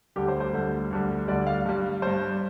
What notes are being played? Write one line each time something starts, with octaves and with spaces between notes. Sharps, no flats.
D2 D3 G3 G4
C5
C5
D2 D3 G3
D2 D3 G3
D2 D3 G3 D5
F5
G2 G3
G2 G3 C5